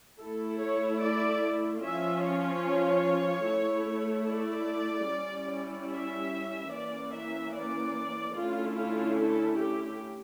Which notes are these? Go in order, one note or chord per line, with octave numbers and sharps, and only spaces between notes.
A3 E4 A4
C#5
D5
F3 C#4 F4 E5
C#5
A3 E4
D5
G3 C#4 E4
E5
E3 A#3 C#4 D5
E5
D5
D3 A3 C#4 E4 F4
F4
A4
G4